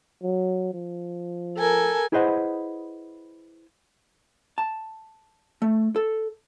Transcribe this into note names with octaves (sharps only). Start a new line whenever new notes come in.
F#3
F3
A4 A#4 G#5
E4 G#4 B4 C5 D#5 F#5
A5
A3
A4